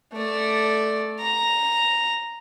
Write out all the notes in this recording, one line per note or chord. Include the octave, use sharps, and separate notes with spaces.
A3 D5
A#5